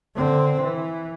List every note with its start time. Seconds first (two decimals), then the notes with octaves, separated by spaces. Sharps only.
0.15 D3 C4
0.61 E3